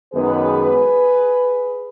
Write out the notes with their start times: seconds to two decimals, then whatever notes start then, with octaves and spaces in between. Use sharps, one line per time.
0.13 F#2 D#3 G#3 B3 G#4 B4